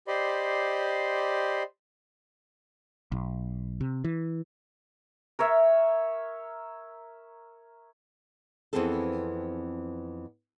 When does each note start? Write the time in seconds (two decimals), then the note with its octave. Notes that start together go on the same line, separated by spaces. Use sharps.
0.08 G4 C5 D5 D#5 B5 C6
3.12 B1
3.81 C3
4.04 E3
5.39 A#4 C#5 E5
8.73 F2 E3 B3 C4 G#4 A4